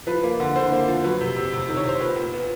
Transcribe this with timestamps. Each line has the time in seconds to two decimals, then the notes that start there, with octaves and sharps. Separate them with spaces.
0.07 F3 B4
0.23 A#3
0.40 D3
0.56 D3 C5
0.72 A#3
0.87 F3
1.03 F#3 B4
1.21 C3
1.36 C3
1.53 C3
1.68 D#3
1.77 C#5
1.84 C3 C5
2.00 A#2 B4
2.16 A#2
2.33 B3